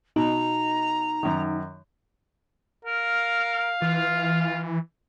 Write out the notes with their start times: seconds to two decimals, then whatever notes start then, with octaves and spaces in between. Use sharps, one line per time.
0.16 B2 D#4 A#5
1.23 F#2 D#3
2.85 A#4 F5
3.82 E3 F4